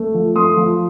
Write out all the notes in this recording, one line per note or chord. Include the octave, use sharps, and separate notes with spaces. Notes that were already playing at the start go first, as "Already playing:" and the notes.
Already playing: A3
F3
A3 C6 D#6
F3